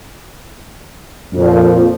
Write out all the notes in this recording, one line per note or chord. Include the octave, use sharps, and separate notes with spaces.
F2 A#2 F3